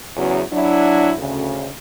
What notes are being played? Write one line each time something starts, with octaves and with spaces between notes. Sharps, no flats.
E2 C#3 F#3
F#3 D4 E4
D2 C#3